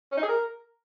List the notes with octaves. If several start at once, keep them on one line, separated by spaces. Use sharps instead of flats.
C#4
D#4
G#4
A#4